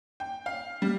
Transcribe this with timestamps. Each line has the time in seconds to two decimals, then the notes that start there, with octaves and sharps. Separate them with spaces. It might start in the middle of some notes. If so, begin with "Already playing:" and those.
0.20 G5
0.46 F5
0.82 G3